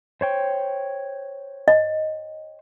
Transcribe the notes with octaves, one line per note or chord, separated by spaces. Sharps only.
C5 C#5 G5
D#5